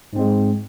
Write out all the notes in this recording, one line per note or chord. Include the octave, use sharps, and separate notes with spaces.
G#2 G#3 C4